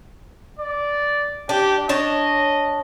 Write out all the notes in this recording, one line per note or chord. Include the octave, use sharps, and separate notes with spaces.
D5
D4 G4
D4 C#5 D#5